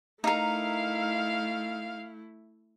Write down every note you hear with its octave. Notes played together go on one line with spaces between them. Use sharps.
A3 D#4 E4 A#4 F5